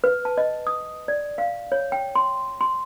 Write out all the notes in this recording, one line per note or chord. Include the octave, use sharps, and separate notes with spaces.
B4
A5
D#5
D#6
D5
F5
C#5
G5
C6
C6